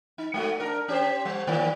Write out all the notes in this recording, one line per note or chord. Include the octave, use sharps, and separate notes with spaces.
D#4
G#3 A3 F#4
D4 A#4
C#4 G4 C5
G3
D#3 A#3 D5